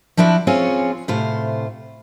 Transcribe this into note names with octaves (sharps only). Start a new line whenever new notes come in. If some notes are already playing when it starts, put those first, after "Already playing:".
F3 C4 D4 E4 F#4
C4 C#4 F4 G#4 C#5
A2 C3 F4 C5